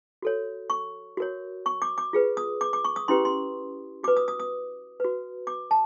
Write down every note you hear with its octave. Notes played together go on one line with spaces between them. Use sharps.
F#4 A4 C#5
C#6
F#4 A#4 C#5
C#6
D6
D6
F4 G#4 B4
D#6
D6
D6
C#6
D#6
C#4 E4 G4 B4 C6
C6
F#4 B4 D6
D#6
D#6
D#6
F#4 B4
D6
A5